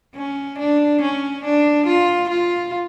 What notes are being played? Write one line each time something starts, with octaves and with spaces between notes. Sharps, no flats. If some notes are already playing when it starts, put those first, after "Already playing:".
C#4
D4
C#4
D4
F4
F4